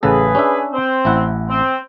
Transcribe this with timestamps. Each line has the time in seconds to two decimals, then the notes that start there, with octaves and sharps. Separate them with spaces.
0.03 A1 C#3 G#4 A4 B4
0.35 C#4 D4 E5
0.72 C4
1.05 A1 E4 F#5
1.49 C4